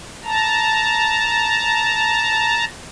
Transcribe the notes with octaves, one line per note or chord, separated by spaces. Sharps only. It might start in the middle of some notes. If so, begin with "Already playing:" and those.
A5 A#5